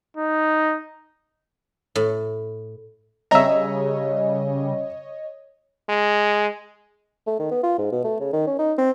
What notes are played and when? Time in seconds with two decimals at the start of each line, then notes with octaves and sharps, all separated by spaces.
0.17 D#4
1.95 A2
3.31 C#3 G3 C#5 D#5 E5 A#5
5.89 G#3
7.27 A3
7.39 D#3
7.51 B3
7.63 F4
7.78 G#2
7.92 B2
8.04 A3
8.20 C#3
8.33 D#3
8.47 C#4
8.59 D#4
8.78 C4